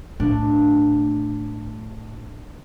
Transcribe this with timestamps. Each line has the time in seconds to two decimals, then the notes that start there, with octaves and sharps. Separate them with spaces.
0.20 A2 D4